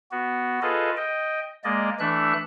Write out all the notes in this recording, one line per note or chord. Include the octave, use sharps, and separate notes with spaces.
B3 F#4
F4 G#4 A4 B4 D#5
D#5 G5
G#3 A#3 D5 D#5
E3 A3 D4 E5 F#6